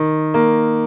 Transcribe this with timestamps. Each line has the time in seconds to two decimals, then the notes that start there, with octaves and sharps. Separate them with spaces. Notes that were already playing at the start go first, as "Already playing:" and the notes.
Already playing: D#3
0.34 A#3